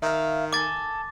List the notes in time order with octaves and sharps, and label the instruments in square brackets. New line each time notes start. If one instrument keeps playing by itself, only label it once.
[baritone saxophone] D#3 [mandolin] E5 F5
[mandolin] A4 G#5 [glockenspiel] D6 A6